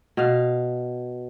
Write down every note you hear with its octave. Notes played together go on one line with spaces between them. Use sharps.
B2 F5